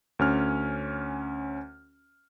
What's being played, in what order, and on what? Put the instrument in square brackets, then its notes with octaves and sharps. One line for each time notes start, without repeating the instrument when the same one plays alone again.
[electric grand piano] D2 C#4 F6